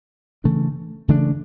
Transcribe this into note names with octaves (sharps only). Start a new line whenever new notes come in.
C#3 E3 A3 D4
C#3 E3 A3 D4